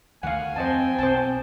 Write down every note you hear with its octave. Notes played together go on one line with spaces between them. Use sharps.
D2 D#3 A3 F5 F#5 G#5
F2 C4 C5 D#5 G5 A5
B1 C5 A5